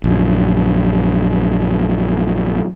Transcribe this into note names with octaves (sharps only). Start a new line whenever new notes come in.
A#1 F#2